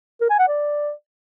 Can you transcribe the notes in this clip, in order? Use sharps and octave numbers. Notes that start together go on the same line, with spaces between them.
A#4
G#5
F#5
D5